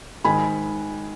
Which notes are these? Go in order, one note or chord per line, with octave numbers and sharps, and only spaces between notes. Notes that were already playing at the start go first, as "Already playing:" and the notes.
G#2 D#3 G#5 B5